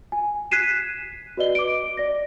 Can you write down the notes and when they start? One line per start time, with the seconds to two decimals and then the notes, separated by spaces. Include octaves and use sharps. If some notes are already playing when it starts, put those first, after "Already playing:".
0.12 G#5
0.51 F#6 G#6 B6 C7 D#7 E7
1.37 F#4 B4 D5 D#5 G7
1.55 D6 D7
1.97 D5 A#6